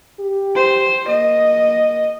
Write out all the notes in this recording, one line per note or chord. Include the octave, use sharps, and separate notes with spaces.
G4
C5
A#3 D#5